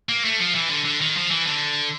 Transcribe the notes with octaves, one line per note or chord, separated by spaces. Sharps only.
A#3
A3
F3
E3
D3
D3
D#3
F3
E3
D3